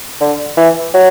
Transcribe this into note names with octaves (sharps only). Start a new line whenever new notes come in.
D3
E3
F#3